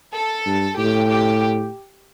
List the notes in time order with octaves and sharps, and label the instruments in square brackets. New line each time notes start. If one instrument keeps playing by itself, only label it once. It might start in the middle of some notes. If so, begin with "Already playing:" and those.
[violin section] A4
[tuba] G2
[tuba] A2 [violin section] G4
[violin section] G4